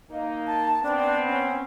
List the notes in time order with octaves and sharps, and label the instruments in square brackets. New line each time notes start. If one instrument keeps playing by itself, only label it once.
[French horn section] A#3 D#4
[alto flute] A5
[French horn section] B3 C4 [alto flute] D4
[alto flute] C#4